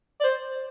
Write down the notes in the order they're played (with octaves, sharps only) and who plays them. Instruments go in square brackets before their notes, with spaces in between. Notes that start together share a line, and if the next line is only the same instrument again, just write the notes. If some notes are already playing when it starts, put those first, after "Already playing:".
[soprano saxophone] D5
C5